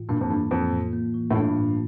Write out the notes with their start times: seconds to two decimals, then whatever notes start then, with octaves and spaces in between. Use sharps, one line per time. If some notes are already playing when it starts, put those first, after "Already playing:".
Already playing: A2 E3 F4
0.09 G2 A#2 A#3
0.21 F2
0.30 G2 E3
0.51 F2 F4
0.72 A2
0.93 A#3
1.14 E3
1.31 A2
1.35 G2 F4
1.56 A2